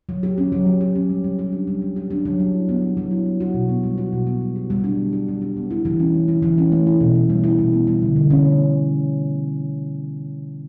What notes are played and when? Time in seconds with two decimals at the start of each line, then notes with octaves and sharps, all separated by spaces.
0.09 F#3
0.23 G4
0.38 C#4
0.52 F#3
0.66 F#3
0.81 G4
0.95 C#4
1.09 G3
1.24 G3
1.39 G4
1.52 D4
1.67 G3
1.82 G3
1.96 G4
2.11 D4
2.25 F#3
2.40 F#3
2.54 E4
2.69 B3
2.82 F#3
2.97 F#3
3.11 E4
3.26 B3
3.40 F#4
3.54 B2
3.69 B3
3.83 G3
3.98 F#4
4.13 B2
4.27 B3
4.41 G3
4.56 G4
4.70 G3
4.84 D4
4.99 B3
5.13 G4
5.28 G3
5.42 D4
5.56 B3
5.71 E4
5.85 E3
5.99 C#4
6.14 A3
6.28 E4
6.42 E3
6.58 C#4
6.72 A3
6.87 E4
7.01 B2
7.15 B3
7.30 G3
7.44 E4
7.59 B2
7.73 B3
7.87 G3
8.02 D3
8.16 D3
8.30 C#4
8.45 A3
8.59 D3